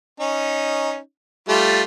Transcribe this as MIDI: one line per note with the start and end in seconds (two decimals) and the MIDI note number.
0.20 0.98 61
0.20 0.98 63
1.48 1.83 55
1.48 1.83 57
1.48 1.83 65